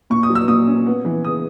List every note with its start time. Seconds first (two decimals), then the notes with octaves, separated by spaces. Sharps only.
0.10 A#2 C#6
0.23 D#6
0.29 F#3
0.35 E6
0.48 A#2 D#6
0.67 C#4
0.86 B3
1.05 E3
1.25 C#3 D#6